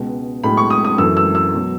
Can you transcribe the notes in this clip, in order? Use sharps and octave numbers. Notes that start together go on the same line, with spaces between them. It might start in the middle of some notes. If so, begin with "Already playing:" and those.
Already playing: C#2 B2 G#3
B1 A2 G#3 B5
C#6
D#6
D#6
F#2 E3 A3 E6
E6
E6
B2 F#3